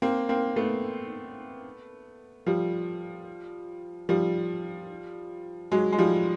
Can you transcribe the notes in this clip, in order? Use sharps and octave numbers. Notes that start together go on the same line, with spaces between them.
A#3 C4
A#3 C4
A3 B3
F3 G3
F3 G3
F#3 G#3
G#3
F3 G3